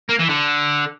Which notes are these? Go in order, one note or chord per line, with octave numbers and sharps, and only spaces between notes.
A#3
E3
D3